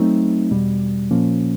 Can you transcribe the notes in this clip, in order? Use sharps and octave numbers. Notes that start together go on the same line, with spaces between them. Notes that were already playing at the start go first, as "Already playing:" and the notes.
Already playing: F#3 A3 C4 D#4
E2 B2 G3
A#2 F3 A#3 C#4